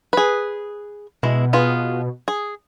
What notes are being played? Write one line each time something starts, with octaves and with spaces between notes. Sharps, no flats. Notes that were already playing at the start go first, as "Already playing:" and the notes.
G#4 B4
B2 G#3 E4
B3 F4 G#4
G#4